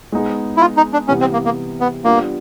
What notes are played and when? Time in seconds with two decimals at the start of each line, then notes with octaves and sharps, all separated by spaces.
0.12 G#3 B3 D#4 G#4
0.57 E4
0.61 F4
0.77 D#4
0.93 D4
1.08 C3 E3 G3 B3 C#4
1.21 C4
1.33 A#3
1.45 A#3
1.81 B3
2.04 G3 A#3 B3 D4 F4